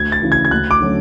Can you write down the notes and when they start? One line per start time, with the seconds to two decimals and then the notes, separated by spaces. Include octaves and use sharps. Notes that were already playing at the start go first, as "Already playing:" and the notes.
Already playing: D2 G#6
0.12 A6
0.22 C#3 E3
0.32 G#6
0.45 G#6
0.51 D2 F#6
0.71 D6
0.80 D3 F#3 A3 C#4